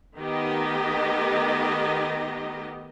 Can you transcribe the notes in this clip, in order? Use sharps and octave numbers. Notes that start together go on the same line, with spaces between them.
D#3 A3 B3 D#4 G4 D#5